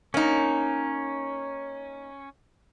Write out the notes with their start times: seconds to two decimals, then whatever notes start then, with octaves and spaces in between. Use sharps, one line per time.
0.14 A#3 C#4 D#4